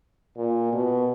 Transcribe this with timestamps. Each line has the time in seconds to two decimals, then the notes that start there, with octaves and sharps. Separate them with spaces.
0.37 A#2
0.73 B2